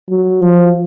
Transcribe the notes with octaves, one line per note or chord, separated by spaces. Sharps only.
F#3
F3